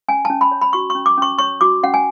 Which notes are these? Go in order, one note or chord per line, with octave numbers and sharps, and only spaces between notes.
C#4 G#5
C#4 A5
B5
C#5
B5
F#4 C#6
C#4 C#6
D6
C#4 C#6
C#5 C#6
F#4 D6
C#4 F#5
G#5